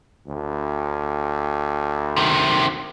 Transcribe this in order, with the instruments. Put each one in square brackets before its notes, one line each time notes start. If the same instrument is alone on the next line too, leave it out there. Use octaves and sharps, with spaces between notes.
[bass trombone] D2
[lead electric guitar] C3 D#3